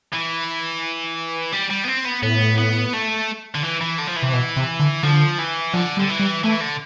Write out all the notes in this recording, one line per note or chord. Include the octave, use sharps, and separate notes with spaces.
E3
G3
G3
B3
C4
B3
A2 B3
B3
A3
D3
E3
E3
D3
F3
E3
C3
B2
C3
D3
D3 F3
E3
D3 F3
G3
D3
E3
G3
E3 A3
D3